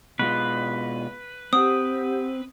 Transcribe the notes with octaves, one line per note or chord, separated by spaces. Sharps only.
B2 G#3 F4 B4
C4 G4 F#5 D#6